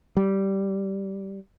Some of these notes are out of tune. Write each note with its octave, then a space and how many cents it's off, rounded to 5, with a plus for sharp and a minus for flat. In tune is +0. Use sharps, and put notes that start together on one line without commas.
G3 -10